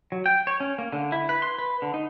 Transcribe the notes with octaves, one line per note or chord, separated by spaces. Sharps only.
F#3
G5
C#5
C#4
A#3
D3
E4
B4
C6
B4
D3
D#4